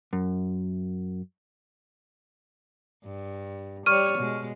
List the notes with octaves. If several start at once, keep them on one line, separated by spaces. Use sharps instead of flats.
F#2
G2
G3 C#5 C#6 F6 D#7
B2 G#3